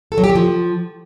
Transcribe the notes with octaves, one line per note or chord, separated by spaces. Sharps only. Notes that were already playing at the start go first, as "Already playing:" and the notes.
A4
F#3
G4
F#3
F3